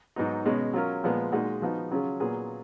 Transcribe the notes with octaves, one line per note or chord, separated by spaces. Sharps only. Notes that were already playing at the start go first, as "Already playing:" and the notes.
G#2 F#3 B3 D#4
B2 G#3 C#4
F#3 C#4 F4 A#4
A#2 F3 G#3 B3
A#2 G#3 D#4 F#4
F3 B3 D#4 F#4
C#3 F#3 C#4 F4 G#4
A#2 F#3 B3 F4 G#4